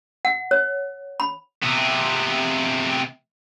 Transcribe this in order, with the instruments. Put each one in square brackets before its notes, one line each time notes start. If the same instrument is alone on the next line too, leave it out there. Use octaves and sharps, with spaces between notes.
[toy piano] F#5
C#5
B5
[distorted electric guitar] C3 B3